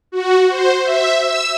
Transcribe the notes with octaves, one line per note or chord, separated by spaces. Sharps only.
F#4
C5
E5
E6